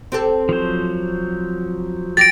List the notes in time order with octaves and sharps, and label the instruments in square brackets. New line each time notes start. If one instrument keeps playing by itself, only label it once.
[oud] C4 G4 A4
[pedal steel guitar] F3 F#3 C5
[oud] G4 [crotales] A6 A#6 D7